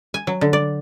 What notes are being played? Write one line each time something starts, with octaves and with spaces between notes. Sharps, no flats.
G#5
F#3
D3
D5